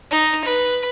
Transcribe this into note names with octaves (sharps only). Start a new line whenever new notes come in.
D#4
B4